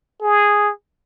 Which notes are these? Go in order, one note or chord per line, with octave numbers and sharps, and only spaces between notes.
G#4